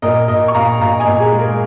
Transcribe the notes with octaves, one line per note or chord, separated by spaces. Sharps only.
A#2 A#4 D#5
A#2 A#4 D#5
C#6
A#2 F5 A#5
A#2 F5 A#5
D#5 G#5
A#2
G#4
G#3
A#4